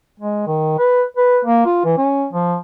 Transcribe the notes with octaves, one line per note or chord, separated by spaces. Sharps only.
G#3
D#3
B4
B4
A#3
F4
E3
C#4
F3